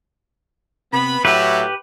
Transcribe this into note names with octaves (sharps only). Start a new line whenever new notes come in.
C3 B3 B5
A2 F#3 G4 B4 E5